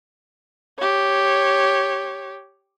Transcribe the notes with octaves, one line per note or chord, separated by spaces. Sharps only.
G4 C#5